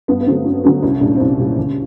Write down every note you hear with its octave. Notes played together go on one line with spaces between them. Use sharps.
G2 B3
B3
D3 F#3 A3 C4
G2 C#4
D3 F#3 A3 B3
C2 C#4
A#2 G3 D4
C#4
C4
C2 C#4
A#2 G3
C#2